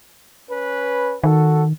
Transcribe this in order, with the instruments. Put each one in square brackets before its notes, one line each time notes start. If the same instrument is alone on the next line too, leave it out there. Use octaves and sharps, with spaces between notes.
[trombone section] C#4 B4
[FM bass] D#3 [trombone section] F#4 A4